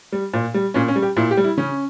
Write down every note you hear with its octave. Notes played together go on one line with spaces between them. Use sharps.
G3
A#2
G3
A#2 C#4
C#4
G3
G4
A#2 E4
G4
G3
E4
C#3 C#4